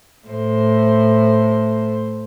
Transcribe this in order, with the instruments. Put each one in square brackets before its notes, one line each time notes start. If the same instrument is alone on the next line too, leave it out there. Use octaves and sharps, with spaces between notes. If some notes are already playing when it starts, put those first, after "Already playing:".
[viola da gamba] A2 C5